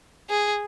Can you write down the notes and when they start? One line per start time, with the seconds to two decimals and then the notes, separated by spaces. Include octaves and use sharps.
0.29 G#4